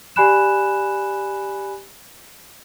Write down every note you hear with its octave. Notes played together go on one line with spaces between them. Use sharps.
G4 D5 G#5 B5 F#6 E7